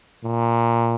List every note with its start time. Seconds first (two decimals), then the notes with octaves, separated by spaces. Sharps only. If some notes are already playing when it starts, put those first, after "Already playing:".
0.24 A#2